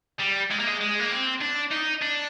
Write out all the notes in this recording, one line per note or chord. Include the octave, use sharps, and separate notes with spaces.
G3
G#3
A#3
G#3
G#3
A#3
C4
D4
D#4
D4